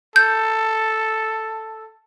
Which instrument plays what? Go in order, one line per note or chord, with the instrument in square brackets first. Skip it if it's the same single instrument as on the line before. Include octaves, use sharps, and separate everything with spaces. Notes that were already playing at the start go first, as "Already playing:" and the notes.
[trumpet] A4 [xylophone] G6